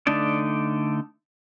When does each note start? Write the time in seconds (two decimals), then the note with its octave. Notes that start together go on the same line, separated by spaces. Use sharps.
0.07 D3 A3 D4 D#4 D5